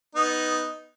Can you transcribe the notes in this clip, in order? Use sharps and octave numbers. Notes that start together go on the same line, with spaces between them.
B3 D#4